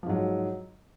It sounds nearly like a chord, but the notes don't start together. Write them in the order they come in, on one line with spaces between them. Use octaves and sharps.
F3 G#2 F#3